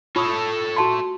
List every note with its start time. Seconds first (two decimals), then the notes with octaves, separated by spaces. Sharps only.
0.16 F4 A4 C#5 D#6
0.76 F#4 A5 C6